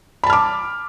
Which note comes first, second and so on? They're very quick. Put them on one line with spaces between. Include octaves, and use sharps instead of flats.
B5 A5 F6 D6